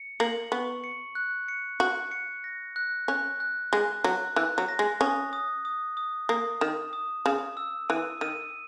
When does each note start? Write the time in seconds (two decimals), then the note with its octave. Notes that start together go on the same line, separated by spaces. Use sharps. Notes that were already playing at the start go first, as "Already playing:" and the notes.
Already playing: C#7
0.20 A#3 F#7
0.52 B3 C#6
0.84 C#7
1.15 F#6
1.48 C#7
1.80 F#4 F#6
2.11 C#7
2.44 A#6
2.76 F#6
3.08 C#4 F#6
3.40 F#6
3.73 G#3 F#6
4.04 F#3 F#6
4.36 E3 F#6
4.58 F#3
4.68 A#6
4.79 G#3
5.00 C#4 D#6
5.33 D#6
5.65 D#6
5.97 D#6
6.29 A#3 D#6
6.61 D#3 E7
6.93 D#6
7.26 C#3 E7
7.57 E6
7.89 E3 D#7
8.21 D#3 D#7